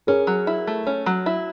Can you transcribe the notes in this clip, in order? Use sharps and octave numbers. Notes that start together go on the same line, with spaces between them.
C#4 G#4 A#4
F#3
E4
A3
C#4
F#3
E4